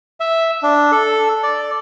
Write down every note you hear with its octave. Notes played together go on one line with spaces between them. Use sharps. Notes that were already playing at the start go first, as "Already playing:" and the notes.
E5
D4
A4
D5